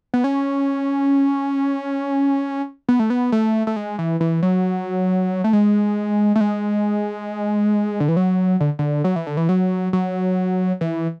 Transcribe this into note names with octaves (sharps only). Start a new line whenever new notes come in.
B3
C#4
B3
A3
B3
A3
A3
G#3
E3
E3
F#3
A3
G#3
A3
G#3
D3
E3
F#3
D3
D3
F#3
E3
D3
E3
F#3
F#3
E3